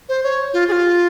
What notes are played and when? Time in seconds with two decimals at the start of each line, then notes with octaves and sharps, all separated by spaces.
0.09 C5
0.23 C#5
0.54 F4
0.68 G#4
0.72 F4